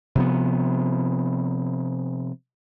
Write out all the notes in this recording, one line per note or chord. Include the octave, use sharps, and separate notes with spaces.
C3 F3 B3